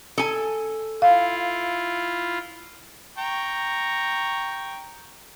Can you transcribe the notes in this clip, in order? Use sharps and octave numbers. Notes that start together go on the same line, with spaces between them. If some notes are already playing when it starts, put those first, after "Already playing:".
A4 G#5
E4 F4 F5
G5 A#5 C#6